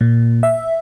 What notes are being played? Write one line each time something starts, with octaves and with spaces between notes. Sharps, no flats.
A#2
E5